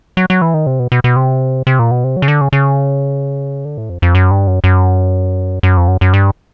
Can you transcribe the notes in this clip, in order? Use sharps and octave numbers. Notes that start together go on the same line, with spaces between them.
F#3
F#3
E3
D#3
C3
B2
B2
B2
C3
C3
A#2
B2
C3
F#3
C#3
D3
C#3
C#3
D3
A2
F2
F2
F#2
G2
F#2
F#2
F#2
F2
F#2
F#2
G2